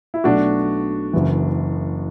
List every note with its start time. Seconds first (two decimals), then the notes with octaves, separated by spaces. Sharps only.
0.14 E4
0.24 B1 B2 F#3 A3 D4 F#4
1.13 F#1 F#2 E3